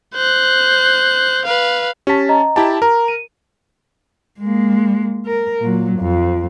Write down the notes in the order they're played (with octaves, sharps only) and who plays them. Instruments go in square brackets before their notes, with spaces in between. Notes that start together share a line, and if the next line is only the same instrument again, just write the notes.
[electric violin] C5 F#6
B4 F5
[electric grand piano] C#4 A5 [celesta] G4 B6
[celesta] D#5 A#5
[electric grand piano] E4 G4 A5
[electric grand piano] A#4 [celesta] A#5
[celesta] D#7
[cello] G#3 A#3
A#4
A#2 F#3
F2